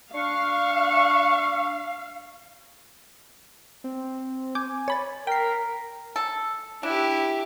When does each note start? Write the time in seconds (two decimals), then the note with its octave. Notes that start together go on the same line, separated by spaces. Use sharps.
0.14 D4 F5 C#6
3.84 C4
4.55 G#5 D6 G6
4.88 C#5 B5 A6
5.27 A#4 G5 B6 C7
6.16 A4
6.83 D4 E4 G4